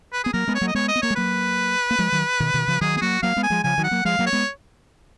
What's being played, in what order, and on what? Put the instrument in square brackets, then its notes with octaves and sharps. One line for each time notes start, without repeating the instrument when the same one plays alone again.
[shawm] B4
[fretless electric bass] B3 [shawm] G#4
[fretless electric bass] F#3 A#3 [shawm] A#4
[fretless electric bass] G#3 B3
[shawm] C#5
[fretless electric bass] F#3 A#3
[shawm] D#5
[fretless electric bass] G#3 B3 [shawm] C#5
[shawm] D#5
[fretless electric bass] B3
[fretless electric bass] A#3 [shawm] C#5
[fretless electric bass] G#3
[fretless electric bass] F#3 A#3 [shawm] B4
[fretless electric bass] A#3
F3 G#3
D#3 F#3
B2 D#3
B2 D#3
C#3 F3
[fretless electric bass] D#3 F#3 [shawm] G#4
[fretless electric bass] B3 [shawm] G#4
[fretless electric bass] F#3 A#3 [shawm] F#4
[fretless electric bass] F#3 A#3 [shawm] F5
[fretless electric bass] G#3 B3
[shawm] G#5
[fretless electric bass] F3 G#3
[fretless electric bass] C#3 F3 [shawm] G#5
[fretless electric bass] D#3 F#3
[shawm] F#5
[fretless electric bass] F#3 A#3
[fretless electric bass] F3 G#3 [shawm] F5
[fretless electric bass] F#3 A#3
[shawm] C#5
[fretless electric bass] G#3 B3